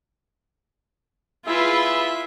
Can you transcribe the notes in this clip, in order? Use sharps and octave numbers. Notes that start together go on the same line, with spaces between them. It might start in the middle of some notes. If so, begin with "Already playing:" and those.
E4 F4 G#4 B4 E5